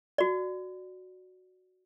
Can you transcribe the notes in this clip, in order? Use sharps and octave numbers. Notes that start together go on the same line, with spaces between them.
F#4 D5